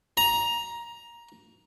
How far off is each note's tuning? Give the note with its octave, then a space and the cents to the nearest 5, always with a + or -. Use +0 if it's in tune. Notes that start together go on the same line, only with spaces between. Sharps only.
A#5 +15